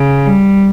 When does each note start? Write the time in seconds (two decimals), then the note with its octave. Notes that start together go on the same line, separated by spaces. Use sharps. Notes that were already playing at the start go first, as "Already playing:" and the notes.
Already playing: C#3
0.26 G3